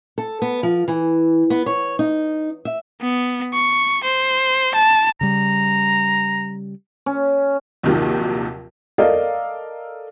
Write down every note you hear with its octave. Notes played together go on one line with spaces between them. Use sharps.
A4
B3
F3
E3
B3
C#5
D#4
E5
B3
C#6
C5
A5
C#3 G3 A#5
C#4
A#1 D#2 C3 D#3 F3 F#3
A4 A#4 D5 D#5 F5